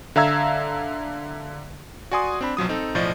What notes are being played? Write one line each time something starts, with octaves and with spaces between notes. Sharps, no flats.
D3 E5 F5 A#5 E6 G#6
F#4 D5 G#5 C6 D#6
C4 D4 B5
B1 F3 F#3 D#6
C4 D#4 A4
B1 A2 F3 D5 D#5